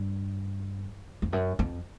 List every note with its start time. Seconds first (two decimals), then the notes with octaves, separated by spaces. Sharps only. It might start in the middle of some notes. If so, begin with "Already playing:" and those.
Already playing: G2
1.22 F2
1.33 F#2
1.59 F2